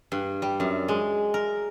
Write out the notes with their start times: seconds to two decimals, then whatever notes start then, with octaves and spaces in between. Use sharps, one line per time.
0.12 G2
0.42 G3
0.60 F#2
0.88 G#3
1.34 A#4